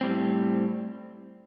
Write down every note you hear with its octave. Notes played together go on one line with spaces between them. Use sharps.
A2 G3 C4